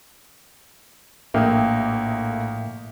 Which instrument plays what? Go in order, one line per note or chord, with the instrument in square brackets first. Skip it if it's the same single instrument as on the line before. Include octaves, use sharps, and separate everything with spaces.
[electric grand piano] A#1 A3 D#6 [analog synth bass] A2 [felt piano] A#3 [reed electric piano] E5 G5